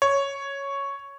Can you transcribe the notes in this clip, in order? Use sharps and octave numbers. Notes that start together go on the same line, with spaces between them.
C#5